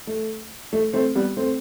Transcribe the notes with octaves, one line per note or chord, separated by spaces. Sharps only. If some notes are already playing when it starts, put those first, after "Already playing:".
A3
A3
A3 C4
G3 B3
A3 C4